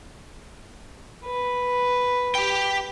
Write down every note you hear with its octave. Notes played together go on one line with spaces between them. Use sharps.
B4
G4 G5